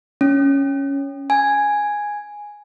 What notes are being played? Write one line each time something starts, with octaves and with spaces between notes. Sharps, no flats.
C#4
G#5